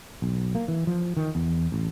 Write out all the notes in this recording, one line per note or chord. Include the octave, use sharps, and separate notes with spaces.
B1
A#3
E3
F3
D#3
E2
A1